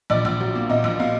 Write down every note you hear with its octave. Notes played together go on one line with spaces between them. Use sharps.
A#1 D5
A#1
F#3
A#3
A#2 D#5
A#1
A#2 F5